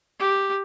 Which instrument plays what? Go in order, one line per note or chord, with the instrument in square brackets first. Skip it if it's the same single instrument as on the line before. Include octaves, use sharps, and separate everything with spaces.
[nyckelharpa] G4